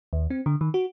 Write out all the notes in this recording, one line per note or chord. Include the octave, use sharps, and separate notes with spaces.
D#2
C4
D3
D#3
F#4